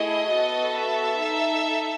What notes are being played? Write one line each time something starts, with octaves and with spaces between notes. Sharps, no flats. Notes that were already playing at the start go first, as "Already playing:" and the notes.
Already playing: A3 E4 G#4 D#5
B3 F#4 A4
E5
D#4 A4